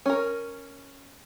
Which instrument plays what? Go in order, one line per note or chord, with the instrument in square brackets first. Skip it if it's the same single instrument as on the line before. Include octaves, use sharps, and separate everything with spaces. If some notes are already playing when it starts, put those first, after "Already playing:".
[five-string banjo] C#4 A#4